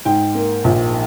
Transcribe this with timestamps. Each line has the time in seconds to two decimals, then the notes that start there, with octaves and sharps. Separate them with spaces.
0.05 G#2 G5
0.35 A#3
0.64 A#1